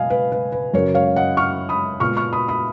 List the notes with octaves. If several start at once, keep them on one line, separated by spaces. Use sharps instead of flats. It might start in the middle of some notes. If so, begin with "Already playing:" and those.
Already playing: B2 F#3 D#5 F5 G#5
B4
B4
B4
F#2 C#3 F#3 A#4 C#5
C#5 F5
D#5 F#5
C#6 F6
B5 D#6
A#2 G#3 B3 C#6 F6
C#6 F6
B5 D#6
B5 D#6